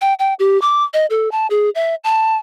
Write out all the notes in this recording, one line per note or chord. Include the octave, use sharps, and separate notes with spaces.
G5
G5
G4
D6
D#5
A4
A5
G#4
E5
A5